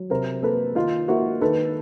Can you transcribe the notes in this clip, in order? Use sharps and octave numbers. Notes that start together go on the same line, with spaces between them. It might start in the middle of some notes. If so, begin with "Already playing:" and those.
Already playing: F#3
C3 A#4 C5
A#3 A4 B4
D#3 D#4 F4
A#3 E4 F#4
D#3 A4 B4